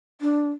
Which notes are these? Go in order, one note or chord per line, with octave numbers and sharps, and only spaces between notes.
D4